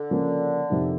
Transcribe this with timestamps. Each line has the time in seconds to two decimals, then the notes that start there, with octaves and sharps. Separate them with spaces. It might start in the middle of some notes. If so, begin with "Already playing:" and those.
Already playing: D3
0.11 C#3 F3 A#3 C#4
0.70 F2 C3 D#3